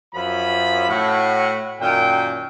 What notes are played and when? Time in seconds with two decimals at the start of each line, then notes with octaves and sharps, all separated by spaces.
0.14 F#2 F3 B5
0.88 A2 F#4 F#5
1.80 F#2 A#2 D#3 G5